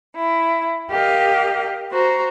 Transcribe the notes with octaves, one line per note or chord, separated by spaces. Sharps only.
E4
G4 A#4 D#5 F5
F#4 C5 A#5